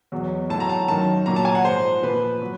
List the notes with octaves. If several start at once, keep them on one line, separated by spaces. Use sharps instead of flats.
E2 B2 F#3
A2 F#3 A5
A#5
A5
F#2 D#3 F#3 A5
A#2 F#3 A#5
A5
G#5
F#5
G#2 F3 C5
A#2 F3 B4
F#3